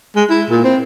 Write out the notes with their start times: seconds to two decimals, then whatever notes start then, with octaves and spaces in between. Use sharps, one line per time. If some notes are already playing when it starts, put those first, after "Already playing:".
0.16 G#3
0.30 E4
0.50 A#2
0.64 C4